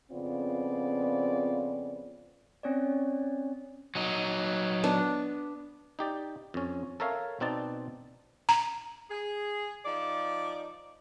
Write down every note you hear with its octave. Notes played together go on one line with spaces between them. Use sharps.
F2 C#3 B3 C4 F4 D5
C4 C#4 C#5 D5
F#3 D#4
B3 D4
D#4 G4 D5
F2 C#4
A4 A#4 C#5 E5 F5
B2 C4 D#4 D5 A5
A#5
G#4
F3 D#4 D5